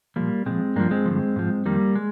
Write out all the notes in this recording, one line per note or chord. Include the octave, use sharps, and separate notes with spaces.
A#2 F3 G3 A#3
A#2 F3 G#3 C4
G2 F3 A#3 D4
G#3 C4
G2 D3 F3
G#2 F3
F2 D#3 G3 A#3
G#3